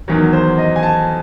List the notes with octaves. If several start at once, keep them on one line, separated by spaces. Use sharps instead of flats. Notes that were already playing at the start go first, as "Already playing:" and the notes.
E2 D#3 F#3
C5
D#5
G#5
A5